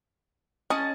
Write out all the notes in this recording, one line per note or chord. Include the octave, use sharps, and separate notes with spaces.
C#4 G#4 D#5 A5